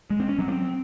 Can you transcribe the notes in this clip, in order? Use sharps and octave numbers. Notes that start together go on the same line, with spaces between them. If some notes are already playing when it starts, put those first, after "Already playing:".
G#3
C4
C#4
F#3
C4